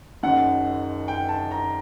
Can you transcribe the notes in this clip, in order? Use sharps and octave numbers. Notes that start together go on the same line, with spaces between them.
F#1 F#2 D#3 F#5
G5
A5
A#5